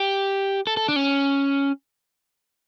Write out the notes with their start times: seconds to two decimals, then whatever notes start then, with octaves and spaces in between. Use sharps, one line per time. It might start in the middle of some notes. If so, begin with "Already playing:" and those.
Already playing: G4
0.67 A4
0.77 A4
0.88 D4
0.96 C#4